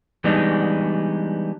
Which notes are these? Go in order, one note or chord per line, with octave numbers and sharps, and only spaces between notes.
E3 G3 G#3 B3 D4 D#4